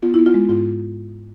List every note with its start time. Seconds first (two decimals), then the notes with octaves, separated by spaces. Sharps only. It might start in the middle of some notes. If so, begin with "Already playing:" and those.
0.02 B3 F4
0.14 E4
0.19 B3
0.26 F4
0.34 G#3
0.49 G#2 F4